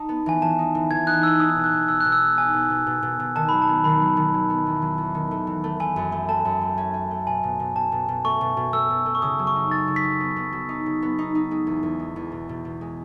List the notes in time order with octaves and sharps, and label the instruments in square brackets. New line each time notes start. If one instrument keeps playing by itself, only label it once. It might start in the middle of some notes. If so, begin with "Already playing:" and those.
Already playing: [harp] D#4 [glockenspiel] A5
[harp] B3
[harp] E3 [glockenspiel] G#5
[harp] E3 [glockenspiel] A5
[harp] D#4
E3
[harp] E3 [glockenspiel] G#6
[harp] D#4 [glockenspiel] F#6
[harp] B3 [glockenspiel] E6
[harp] D#4 [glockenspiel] D#6
[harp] B2
[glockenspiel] F#6
[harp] B2
[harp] B2 [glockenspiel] E6
[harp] B2 [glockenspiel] F#6
[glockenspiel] E6
[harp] G#3
[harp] D#4 [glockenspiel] G#5
[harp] B2
B2
B2
B2
B2
[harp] D#3 [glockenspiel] A5
[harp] F#3 [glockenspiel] B5
[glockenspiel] A5
[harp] B3
[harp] D#3 [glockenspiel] B5
[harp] F#3
D#3
F#3
B3
E2
F#3
E2
D#3
A3
E3
A3
[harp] A3 [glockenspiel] G#5
[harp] F#2
A3
[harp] A3 [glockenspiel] A5
[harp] F#2
A3
C#4
C#4
A3
[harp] B2 [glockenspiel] G#5
[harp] B2
B2
[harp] B2 [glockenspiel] A5
[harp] B2
B2
[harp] A3 [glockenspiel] C#6
[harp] B2
B2
[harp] A3 [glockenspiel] E6
[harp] B2
A3
[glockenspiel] C#6
[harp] C#3 [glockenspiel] D#6
[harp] F#3
[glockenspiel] C#6
[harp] D#4
[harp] D#4 [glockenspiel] A6
[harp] C#3
[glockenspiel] B6
[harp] F#3
B3
B3
F#3
D#4
C#3
B3
D#4
D#4
G#3
E2
E2
G#3
E2
B2
B2
B2
G#3